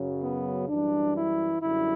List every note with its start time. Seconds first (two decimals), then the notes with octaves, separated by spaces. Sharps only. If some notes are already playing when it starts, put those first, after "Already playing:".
Already playing: F#2 C#3 F#3
0.22 B3
0.68 F#2 E3 G3 D4
1.16 E4
1.62 F#2 D3 G3 E4